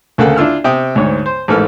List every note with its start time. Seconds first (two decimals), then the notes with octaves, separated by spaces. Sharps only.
0.18 D2 C#3 A#3 A4 F#5
0.37 D4 E4 F4 E6 F6
0.64 C3 G5 D#6
0.95 D2 G#2 C#5
1.26 C5
1.48 A1 G#2 A#3 A4 B4 F6